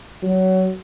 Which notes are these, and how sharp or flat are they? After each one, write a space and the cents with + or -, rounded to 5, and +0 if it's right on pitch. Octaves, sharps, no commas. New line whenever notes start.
F#3 +20